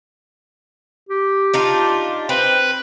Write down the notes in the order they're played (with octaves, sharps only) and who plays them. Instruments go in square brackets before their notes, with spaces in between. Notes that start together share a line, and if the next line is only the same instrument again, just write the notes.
[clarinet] G4
[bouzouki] D4 D#4 F4
[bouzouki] C4 [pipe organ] B4